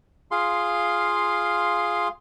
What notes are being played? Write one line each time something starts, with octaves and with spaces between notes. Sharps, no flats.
F4 G#4 F5 C6